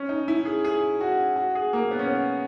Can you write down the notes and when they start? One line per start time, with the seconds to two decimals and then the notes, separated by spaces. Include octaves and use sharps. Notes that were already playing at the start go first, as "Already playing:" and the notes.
Already playing: C#4
0.09 D#4
0.28 E4
0.45 G#4
0.65 G#4
1.01 F#4
1.36 F#4
1.55 G#4
1.73 A#3
1.91 B3
1.99 C#4
2.07 B3